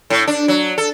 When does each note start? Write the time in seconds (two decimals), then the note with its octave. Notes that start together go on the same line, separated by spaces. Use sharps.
0.10 A2
0.28 D4
0.48 F#3
0.78 A4